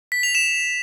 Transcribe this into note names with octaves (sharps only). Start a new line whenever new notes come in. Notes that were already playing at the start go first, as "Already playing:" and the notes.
B6
F7
E7